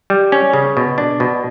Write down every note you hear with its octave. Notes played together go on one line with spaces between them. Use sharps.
G3
C#4
C#3
B2
D4
B2